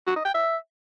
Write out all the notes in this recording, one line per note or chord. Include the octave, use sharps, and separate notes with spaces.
F#4
D#5
G5
E5